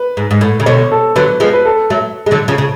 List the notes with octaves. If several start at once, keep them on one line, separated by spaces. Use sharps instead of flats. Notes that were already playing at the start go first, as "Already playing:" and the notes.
Already playing: B4
G#2
G#2
A2
C#3
B2 D3 C#5
A4
D3 F#3 B4
F3 G#3 B4
B4
A4
F#3 A3
G#3
D3 F#3
C#3 F3
C#3